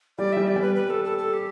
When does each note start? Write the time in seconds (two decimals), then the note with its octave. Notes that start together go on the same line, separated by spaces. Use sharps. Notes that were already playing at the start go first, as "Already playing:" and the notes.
0.18 G3 D5
0.33 G3 E5
0.47 D5
0.56 G3
0.62 B4
0.75 B4
0.90 A4
1.04 A4
1.18 A4
1.33 G4